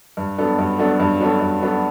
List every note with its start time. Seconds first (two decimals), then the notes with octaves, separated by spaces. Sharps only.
0.17 G2
0.38 F#3 B3 D4 A4
0.59 G2
0.79 F#3 B3 D4 A4
1.00 G2
1.21 F#3 B3 D4 A4
1.41 G2
1.62 F#3 B3 D4 A4